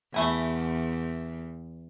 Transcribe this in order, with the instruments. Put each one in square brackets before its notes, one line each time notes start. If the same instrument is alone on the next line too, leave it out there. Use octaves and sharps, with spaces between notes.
[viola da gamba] E2 [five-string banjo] A3 E4 G#5